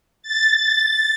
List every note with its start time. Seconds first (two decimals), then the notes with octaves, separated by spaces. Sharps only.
0.22 A6